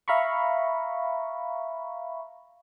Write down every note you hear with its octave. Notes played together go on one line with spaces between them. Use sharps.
E5 F5 A#5 B5 C#6